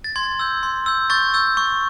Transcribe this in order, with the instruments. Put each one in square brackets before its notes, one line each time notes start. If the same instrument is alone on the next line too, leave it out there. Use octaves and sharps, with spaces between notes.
[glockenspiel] A6
C6 G#6
E6 G6
C6
E6 G6
C#6 G6 A6
E6 G6
C#6